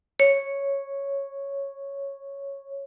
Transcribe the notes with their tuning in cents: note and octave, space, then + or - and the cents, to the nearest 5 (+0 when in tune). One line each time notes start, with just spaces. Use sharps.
C#5 -5